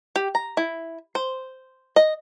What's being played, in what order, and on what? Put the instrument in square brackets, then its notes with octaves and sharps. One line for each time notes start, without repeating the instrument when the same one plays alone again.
[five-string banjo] G4
A#5
E4
C5
D#5